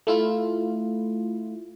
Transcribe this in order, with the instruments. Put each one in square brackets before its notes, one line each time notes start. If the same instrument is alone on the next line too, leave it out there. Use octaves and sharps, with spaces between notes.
[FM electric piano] A3 E4 F4